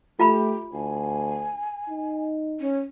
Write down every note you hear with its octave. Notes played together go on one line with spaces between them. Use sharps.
A3 F4 G4 A#5 B5
D2 G#5
D#4
C#4